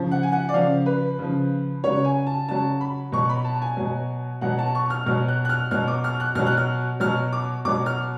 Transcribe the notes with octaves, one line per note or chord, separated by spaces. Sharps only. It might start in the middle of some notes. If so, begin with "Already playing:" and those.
Already playing: C#3 F3
F#5
G#5
F#5
D5
C#3 F3 F5
B4
C#3 F3
C#3 F#3 C#5
G#5
A5
C#3 F#3 A5
B5
B2 F#3 C#6
B5
A5
G#5
B2 F#3
B2 F#3 F#5
A5
C#6
F6
B2 F#3 F6
F#6
F#6
F6
B2 F#3 F6
D6
F6
F#6
B2 F#3 F6
F#6
F6
B2 F#3 F6
D6
B2 F#3 D6
F6